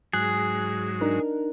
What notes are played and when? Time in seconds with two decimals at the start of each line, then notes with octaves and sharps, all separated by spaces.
0.13 G#2 F#3 G#4 F#6
1.01 D4 D#4 A#4